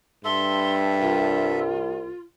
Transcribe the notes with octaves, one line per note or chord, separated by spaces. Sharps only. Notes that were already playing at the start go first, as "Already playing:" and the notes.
G2 A4 E5 C6
C2 F4